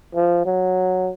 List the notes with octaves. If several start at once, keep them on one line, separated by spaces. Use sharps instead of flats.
F3
F#3